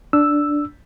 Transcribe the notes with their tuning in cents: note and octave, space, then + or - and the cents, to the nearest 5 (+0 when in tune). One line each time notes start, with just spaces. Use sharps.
D4 +0 E6 +0